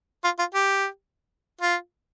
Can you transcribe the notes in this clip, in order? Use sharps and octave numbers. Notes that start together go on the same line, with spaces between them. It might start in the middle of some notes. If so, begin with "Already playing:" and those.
F4
F4
G4
F4